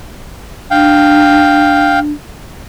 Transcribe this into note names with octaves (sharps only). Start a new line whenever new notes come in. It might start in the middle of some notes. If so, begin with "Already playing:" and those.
D4 F5 G5